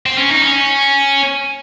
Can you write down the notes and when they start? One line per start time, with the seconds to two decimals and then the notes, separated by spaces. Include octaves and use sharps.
0.06 C4
0.18 C#4
0.31 D#4
0.43 C#4